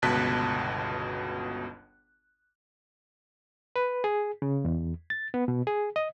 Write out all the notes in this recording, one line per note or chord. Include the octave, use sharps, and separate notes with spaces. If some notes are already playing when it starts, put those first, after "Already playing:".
G1 C#2 B2 A5 F#6 B6
B4
G#4
C#3
E2
A6
B3
B2
G#4
D#5